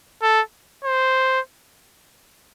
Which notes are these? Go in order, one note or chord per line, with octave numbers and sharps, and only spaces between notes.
A4
C5